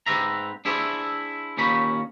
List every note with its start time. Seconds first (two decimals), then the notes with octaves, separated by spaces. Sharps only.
0.06 G#2 C4 B4 E5 A#5
0.65 D4 E4 G#4 C5 E5
1.57 D#2 A#2 C#4 D#4 B5